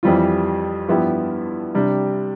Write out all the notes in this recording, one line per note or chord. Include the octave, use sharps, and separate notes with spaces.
F2 E3 G3 C4 F4
G2 F3 B3 E4 G4
C3 G3 D4